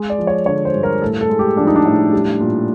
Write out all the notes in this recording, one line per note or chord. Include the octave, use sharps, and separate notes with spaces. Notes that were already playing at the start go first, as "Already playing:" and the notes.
Already playing: G#3
D5
F3
C#5
D3 C#5
C5
G2
A#4
A2 A4
A4
G#3
G4
F3 D4
D#4
D4
A2
G3
A#2